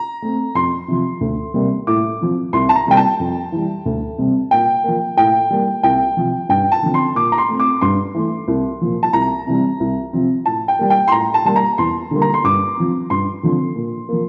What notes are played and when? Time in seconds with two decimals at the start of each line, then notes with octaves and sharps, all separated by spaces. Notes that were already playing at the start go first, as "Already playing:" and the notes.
Already playing: A#5
0.22 A3 C4
0.55 F2 C6
0.88 C3 F3
1.21 D2
1.54 C3 G3 A#3
1.87 A2 D6
2.21 F3 C4
2.53 C2 C6
2.69 A5
2.76 A#5
2.87 C3 G3 A#3 G5
2.97 A5
3.20 F2
3.52 E3 G3
3.86 D2
4.18 C3 G3 C4
4.51 A#2 G5
4.84 F3 A#3
5.17 A2 G5
5.50 G3 A#3
5.83 C2 G5
6.17 C3 F3
6.49 G2 G5
6.72 A5
6.82 D3 F3 C4
6.94 C6
7.15 A#2 D6
7.32 A#5
7.38 C6
7.48 A3 C4
7.60 D6
7.81 G2 C6
8.14 E3 A3
8.48 C2
8.81 A#2 F3
9.03 A5
9.13 C2 A#5
9.47 C3 E3 G3 C4
9.80 C2
10.13 C3 F3 C4
10.46 A2 A5
10.68 G5
10.79 G3 A#3
10.90 G5
11.08 C6
11.12 A2 A#5
11.34 A5
11.45 G3 A#3 A5
11.56 A#5
11.78 E2 C6
12.11 D3 G3 A#3
12.22 A#5
12.34 C6
12.44 G2 D6
12.77 F3 C4
13.10 G2 C6
13.43 D3 F3 C4
13.76 A#2
14.09 F3 A#3